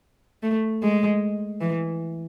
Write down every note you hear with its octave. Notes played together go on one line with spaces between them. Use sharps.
A3
G#3
E3